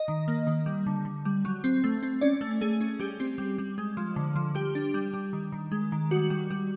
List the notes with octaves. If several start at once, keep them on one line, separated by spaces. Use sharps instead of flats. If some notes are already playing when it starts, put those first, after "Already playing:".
Already playing: D#5
D#3
A#3
D#3
G3
D3
D3
G3
F#3
C4
A3
C4
C#4 D5
A3
A3 G#4
C#4
G3 G4
C4
G3
G3
G#3
F3
D3
F3
G3 G4
D4
G3
G3
D#3
D#3
G#3
D#3
G3 F#4
G3
G3